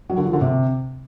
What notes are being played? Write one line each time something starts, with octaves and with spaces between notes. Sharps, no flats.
F#3
D3
F3
D3
C3